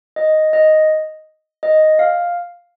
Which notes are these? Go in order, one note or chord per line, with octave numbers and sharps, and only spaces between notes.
D#5
D#5
D#5
F5